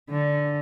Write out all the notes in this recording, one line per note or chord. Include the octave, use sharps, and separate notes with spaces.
D3